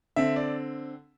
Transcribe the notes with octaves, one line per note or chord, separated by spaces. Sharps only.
D3 C4 E5
D5